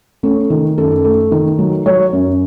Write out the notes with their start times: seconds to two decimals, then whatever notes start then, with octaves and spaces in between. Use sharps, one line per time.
0.23 A3 C#4
0.50 D#3
0.78 F#2 A4
1.04 A3
1.32 D#3
1.59 F#3
1.86 F#3 C#5
2.13 F#2